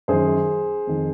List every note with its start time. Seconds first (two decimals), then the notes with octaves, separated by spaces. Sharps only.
0.08 F#2 D#3 G#4 C5
0.87 F2 D#3